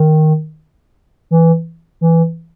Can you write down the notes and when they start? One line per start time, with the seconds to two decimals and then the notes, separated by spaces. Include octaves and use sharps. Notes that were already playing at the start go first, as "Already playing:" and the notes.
Already playing: D#3
1.31 E3
2.01 E3